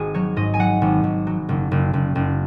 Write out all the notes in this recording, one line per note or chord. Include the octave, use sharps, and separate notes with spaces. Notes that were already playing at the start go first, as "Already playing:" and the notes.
Already playing: G#1 F#4 G#4
F#3 C#5
G#2 D#5
G#5
F#3 F#5
G#1
G#1
F#3
F#1
F#1
F#1
F#1